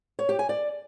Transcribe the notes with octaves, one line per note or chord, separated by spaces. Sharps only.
C#5
G4
G#5
D5